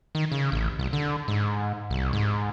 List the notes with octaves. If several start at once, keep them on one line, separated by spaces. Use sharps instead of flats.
D#3
C#3
A1
C2
D3
G#2
C2
G#2